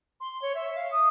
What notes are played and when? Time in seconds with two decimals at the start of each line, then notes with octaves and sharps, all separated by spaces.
0.20 C6
0.42 C#5
0.55 E5
0.75 F5
0.91 D#6